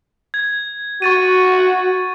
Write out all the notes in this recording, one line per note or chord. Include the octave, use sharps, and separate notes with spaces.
G#6
F#4 C#6 A6 D#7